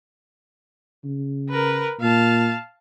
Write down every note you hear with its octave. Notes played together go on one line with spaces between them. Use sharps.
C#3
A#4 B4
A#2 F5 A5